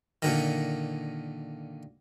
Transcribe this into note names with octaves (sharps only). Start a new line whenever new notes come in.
A#2 D3 D#3